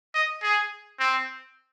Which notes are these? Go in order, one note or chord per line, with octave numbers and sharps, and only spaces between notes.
D#5
G#4
C4